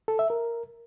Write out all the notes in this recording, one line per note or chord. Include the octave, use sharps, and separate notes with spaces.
A4
E5
A#4